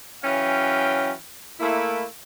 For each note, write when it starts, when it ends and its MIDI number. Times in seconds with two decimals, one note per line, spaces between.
0.23 1.12 52
0.23 1.12 54
0.23 1.12 61
0.23 1.12 77
0.23 1.12 79
1.60 2.03 57
1.60 2.03 58
1.60 2.03 64